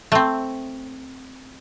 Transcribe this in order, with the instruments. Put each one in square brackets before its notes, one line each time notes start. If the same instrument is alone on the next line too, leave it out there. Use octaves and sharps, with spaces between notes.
[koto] A3 C4